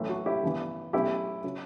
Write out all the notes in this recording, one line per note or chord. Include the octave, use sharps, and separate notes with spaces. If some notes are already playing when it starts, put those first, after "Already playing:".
Already playing: B1 A2 E3 A3 C#4
F#4
E4 G4
A1 G2 E3 B3
B1 B2 A3 C#4 E4 G4
C#3 F#3